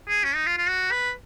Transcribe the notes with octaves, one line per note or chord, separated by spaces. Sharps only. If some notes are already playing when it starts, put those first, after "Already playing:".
G#4
C#4
D#4
F4
F4
F#4
B4